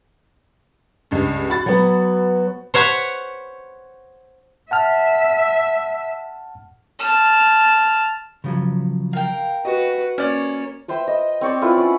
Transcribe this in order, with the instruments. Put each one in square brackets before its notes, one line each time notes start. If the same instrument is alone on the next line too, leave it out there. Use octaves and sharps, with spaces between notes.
[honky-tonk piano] C#2 G2
F#4 B5 A6
[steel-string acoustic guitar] F#3 B3
[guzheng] C5 C#5 F#5 B5
[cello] E5 [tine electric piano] F#5 A5 F6
[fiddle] A5 F6
[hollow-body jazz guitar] C#3 F3 F#3
[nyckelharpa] A#4 [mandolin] F5 G5
[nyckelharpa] F#4 B4 [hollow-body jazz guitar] D#5
[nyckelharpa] A#3 C#5 [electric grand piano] C#4 D5 [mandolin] F6
[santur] B4 C5 E5 G5
D#5
C4 C#5 D5 G5
E4 F4 B4 G#5
C#4 F#5